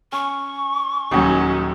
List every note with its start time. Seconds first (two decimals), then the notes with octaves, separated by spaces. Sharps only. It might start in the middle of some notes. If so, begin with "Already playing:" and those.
0.12 C#4 C#6
1.11 D#1 D#2 F#3 C#4 D#4 F#4